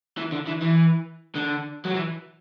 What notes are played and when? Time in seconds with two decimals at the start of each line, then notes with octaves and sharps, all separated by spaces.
0.18 E3
0.32 D3
0.47 E3
0.62 E3
1.36 D3
1.85 F#3
1.94 E3